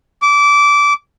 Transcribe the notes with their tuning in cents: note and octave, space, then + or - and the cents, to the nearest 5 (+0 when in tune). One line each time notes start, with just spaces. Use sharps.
D6 -20